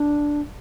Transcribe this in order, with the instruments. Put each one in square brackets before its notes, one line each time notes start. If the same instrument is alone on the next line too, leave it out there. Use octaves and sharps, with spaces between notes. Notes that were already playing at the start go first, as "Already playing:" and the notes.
Already playing: [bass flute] D4